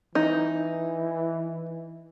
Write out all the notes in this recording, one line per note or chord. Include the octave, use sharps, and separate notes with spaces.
E3 D#4